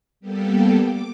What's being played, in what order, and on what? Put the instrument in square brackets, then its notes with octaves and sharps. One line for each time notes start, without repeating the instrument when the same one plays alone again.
[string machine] G3 A#3 B3 G4 A4
D6